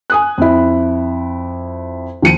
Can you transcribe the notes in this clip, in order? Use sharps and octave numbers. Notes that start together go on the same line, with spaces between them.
G#5 D#6 F#6
F2 E4
D#2 F3 C#7 D#7